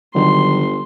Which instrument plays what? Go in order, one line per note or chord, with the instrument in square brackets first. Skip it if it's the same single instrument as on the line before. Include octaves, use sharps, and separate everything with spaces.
[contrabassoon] G1 [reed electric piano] D3 D#3 F#3 [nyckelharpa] C6